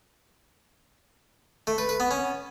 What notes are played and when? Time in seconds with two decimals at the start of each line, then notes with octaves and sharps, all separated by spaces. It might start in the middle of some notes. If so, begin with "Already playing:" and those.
1.67 A3
1.78 B4
1.89 B4
2.00 B3
2.11 C#4